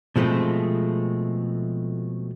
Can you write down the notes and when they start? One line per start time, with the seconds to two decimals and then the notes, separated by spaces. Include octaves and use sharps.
0.16 B2 F3 G#3 A3 C4